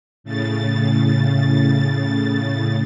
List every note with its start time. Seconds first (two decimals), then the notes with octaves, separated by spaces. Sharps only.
0.24 A2 C#3 A6